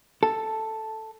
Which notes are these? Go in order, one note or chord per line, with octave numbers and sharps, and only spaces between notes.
A4